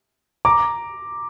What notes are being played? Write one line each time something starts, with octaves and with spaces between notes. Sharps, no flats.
A#5 D6